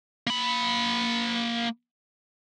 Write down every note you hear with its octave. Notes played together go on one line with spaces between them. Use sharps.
A#3 B5